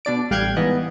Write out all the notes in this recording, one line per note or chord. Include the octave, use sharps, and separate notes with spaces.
B2 D4 D5 D7
A1 G3 F5 G5 F#6 G#6
G#2 E3 B3 D#5